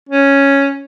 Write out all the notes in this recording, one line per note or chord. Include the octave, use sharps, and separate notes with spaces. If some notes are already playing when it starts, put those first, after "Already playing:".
C#4